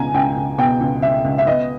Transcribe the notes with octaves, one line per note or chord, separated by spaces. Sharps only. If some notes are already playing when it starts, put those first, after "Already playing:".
Already playing: C#2 B2 G#5 A#5
C#2 G5
C#2
B2 G5
C#2
C#2 E5
C#2
E5
B3 D#5